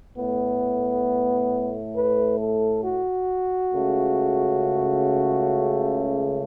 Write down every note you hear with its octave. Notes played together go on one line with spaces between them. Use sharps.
A2 A3 B3
B4
A4
F#4
C#2 C#3 A3